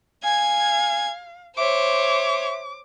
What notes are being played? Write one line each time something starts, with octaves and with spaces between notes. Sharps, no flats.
F5 G#5 G#6
C5 C#5 E5 D6